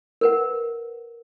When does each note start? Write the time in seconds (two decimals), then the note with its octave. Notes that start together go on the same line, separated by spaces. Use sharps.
0.21 A#4 B4 F#5